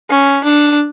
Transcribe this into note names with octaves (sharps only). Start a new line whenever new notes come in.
C#4
D4